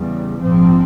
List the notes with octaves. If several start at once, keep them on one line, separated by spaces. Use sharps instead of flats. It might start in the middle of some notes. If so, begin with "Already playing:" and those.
Already playing: E2 C#3 G3
A#1 G#2 F3 C4